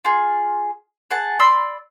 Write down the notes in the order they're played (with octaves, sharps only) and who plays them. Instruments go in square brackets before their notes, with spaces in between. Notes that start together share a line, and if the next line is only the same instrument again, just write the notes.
[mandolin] F4 G#4
G#4 F#5 A5
D5 B5 C6 E6